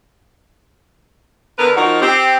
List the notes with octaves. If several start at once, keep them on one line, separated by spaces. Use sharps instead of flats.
D3 A#4 B4
F3 D#4 F#4 A#4
C4 G4